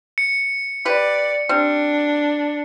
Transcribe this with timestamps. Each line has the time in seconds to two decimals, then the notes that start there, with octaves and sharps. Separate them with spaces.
0.18 C#7
0.85 G4 B4 D5
1.49 G3 C4 D4